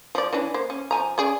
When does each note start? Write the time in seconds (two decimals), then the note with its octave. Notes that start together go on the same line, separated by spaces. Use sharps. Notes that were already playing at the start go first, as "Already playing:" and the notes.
0.15 F3 D5
0.33 E3 C#4 D4
0.54 A#3 C5
0.70 C#4
0.91 F3 G#5 A#5
1.18 C#4 G#4 D5